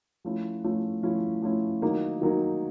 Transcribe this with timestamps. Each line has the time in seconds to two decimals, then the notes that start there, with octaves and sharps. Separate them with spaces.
0.25 F3 A3 C#4 E4
0.64 F3 A3 C#4 E4
1.03 F3 A3 C#4 E4
1.42 F3 A3 C#4 E4
1.82 D#3 F#3 A#3 D#4
2.22 D#3 F#3 A#3 D#4